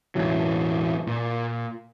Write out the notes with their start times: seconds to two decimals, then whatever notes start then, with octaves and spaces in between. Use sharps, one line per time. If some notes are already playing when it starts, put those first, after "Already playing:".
0.15 E1 A1 E3 F#3
1.07 A#2